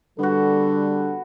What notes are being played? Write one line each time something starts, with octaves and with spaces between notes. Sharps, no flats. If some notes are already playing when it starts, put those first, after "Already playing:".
D3 G3 B3 F#4 A4